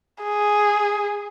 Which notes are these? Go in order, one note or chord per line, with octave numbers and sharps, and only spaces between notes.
G#4